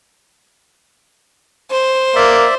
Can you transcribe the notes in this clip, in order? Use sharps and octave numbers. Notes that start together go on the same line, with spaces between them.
C5
A#3 D5 E5